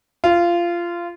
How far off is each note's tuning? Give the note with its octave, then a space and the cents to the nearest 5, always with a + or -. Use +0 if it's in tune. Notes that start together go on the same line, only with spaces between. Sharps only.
F4 -20